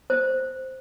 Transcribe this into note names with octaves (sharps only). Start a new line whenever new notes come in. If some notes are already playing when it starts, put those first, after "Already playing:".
C5